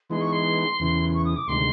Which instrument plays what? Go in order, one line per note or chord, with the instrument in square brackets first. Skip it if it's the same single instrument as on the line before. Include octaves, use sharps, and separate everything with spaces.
[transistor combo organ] E3 G#3 B3 D#4 G#4 [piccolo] C6
[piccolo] C#6
C6
[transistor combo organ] E2 C#3 E3
[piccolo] C#6
D#6
D6
[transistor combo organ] D2 C3 D#3 G#3 [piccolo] C6